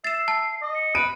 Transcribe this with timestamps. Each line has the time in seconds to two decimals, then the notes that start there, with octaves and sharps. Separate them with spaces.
0.04 E5 A6 C7 E7
0.28 A5
0.62 D#5 D6
0.74 C#7
0.95 B4 D7 D#7